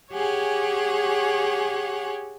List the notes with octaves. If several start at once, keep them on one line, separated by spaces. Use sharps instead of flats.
G4 G#4 C#5 F#5 G#5